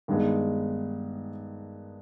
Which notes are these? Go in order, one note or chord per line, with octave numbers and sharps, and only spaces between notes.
G2 D#3 G#3 B3